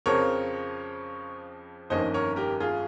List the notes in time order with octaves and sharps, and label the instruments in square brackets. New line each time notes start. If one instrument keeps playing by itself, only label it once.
[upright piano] F2 C#3 F3 C4 A#4 C#5
G1 F2 D#3 A#3 C#4 C5 D#5
A#4 C#5
G4 A#4
F4 G#4